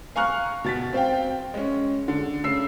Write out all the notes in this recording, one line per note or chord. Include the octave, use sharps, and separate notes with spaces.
F5 G#5 A#5 C#6 F6 F#6
B2 A6 B6
C4 C5 F5 G5
G#3 C#4
D3
C#3 E6 C7